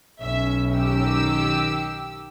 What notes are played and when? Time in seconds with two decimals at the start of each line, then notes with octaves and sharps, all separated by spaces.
0.21 B1 C#4 E5
0.73 D#3 G4 E6